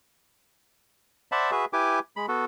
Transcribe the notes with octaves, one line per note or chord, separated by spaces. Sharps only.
C5 D5 E5 F#5 A5 B5
F#4 G#4 B4 E5
E4 G4 B4 G#5 D6
G#3 B5
B3 F#4 A4